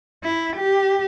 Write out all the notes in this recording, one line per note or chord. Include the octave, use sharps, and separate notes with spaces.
E4
G4